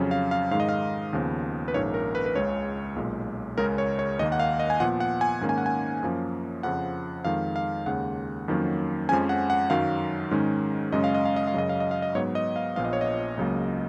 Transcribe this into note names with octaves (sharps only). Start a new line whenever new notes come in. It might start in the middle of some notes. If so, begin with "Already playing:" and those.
Already playing: F2 C#3 F#3 C#4
F5
F5
G#2 D#3 G#3 F5
D#5
F5
D#2 C#3 F3 B3
B4
A#1 G#2 D#3 A#3 C#4 C#5
A#4
B4
B4
C#2 C#3 G#3 C#4 C#5
B1 A#2 G#3
C#2 C#3 G#3 C#4 A#4
C#5
C#5
D#2 D#3 A#3 D#5
F#5
F5
D#5
G#5
A#2 F3 B3 F#5
F#5
G#5
G#2 D#3 A#3 C#4
G#5
F#5
G#5
F#2 F3 A#3 C#4
F2 C#3 F3 F#5
F2 D#3 G#3 F5
F5
D#2 C#3 G#3 F#5
F2 D#3 F#3 A#3 C#4
F2 F3 G#3 C#4 G#5
F#5
F#5
F#2 D#3 F#3 F5
G#2 D#3 G#3 C#4
F#2 C#3 G#3 C#4 D#5
F5
D#5
F5
D#5
F5
F#2 C#3 F#3 D#5
F5
D#5
F5
D#5
G#2 F#3 B3 C#5
D#5
F5
A#1 A#2 F3 B3 F5
D#5
C#5
D#5
C#2 C#3 F#3 A#3